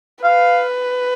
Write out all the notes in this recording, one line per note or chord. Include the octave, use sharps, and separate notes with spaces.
B4 F5